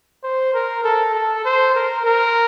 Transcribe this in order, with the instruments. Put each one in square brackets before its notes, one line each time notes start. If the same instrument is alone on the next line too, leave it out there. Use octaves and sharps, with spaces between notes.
[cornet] C5
A#4
A4
A4
C5
A#4
A#4